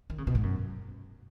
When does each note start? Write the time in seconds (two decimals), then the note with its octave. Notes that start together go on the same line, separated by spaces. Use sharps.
0.10 D#3
0.18 C#3
0.27 B2
0.35 G#2
0.43 F#2